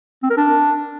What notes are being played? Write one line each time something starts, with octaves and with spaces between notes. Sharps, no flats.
C4
A#4
D4